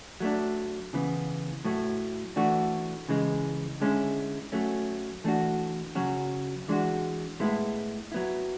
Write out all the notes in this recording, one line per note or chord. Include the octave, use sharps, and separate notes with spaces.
F#3 A3 D4
C#3 E3 B3
A2 F#3 A3
E3 A3 D4 F#4
C#3 E3 G#3
D3 G#3 C#4 E4
F#3 A3 C#4
E3 A3 D4 F#4
C#3 F#3 C#4 F#4
E3 G#3 D4 F#4
A2 G#3 B3 E4
F#3 B3 E4